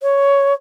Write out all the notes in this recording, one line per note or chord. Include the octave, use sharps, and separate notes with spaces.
C#5